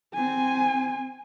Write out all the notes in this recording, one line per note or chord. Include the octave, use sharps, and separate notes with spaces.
C4 G#5